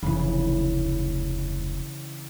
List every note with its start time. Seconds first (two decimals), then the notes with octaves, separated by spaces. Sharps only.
0.03 F1 D2 C#3 E3